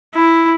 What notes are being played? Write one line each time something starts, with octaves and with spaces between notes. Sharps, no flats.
E4